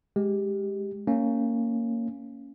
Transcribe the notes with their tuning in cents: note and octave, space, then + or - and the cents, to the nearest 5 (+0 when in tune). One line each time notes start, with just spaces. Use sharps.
G#3 +0 G4 +0
A#3 -15 C#4 +0